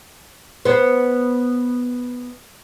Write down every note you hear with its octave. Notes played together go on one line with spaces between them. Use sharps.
B3 C5